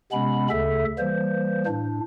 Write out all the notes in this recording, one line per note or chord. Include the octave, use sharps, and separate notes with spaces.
C3 G#3 B3 C#4 B5
D2 C#3 A4 E5
E3 G3 A#3 C5
A2 D4